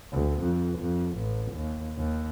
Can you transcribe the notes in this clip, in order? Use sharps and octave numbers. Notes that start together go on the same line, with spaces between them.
D2
F2
F2
A1
D#2
D#2